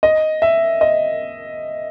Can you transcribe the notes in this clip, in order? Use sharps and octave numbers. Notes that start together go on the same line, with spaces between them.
D#5
E5
D#5